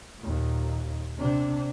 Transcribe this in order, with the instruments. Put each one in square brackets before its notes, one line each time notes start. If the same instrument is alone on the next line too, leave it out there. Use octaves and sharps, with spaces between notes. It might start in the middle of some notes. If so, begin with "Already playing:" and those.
[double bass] D#2 A#2
C3 D4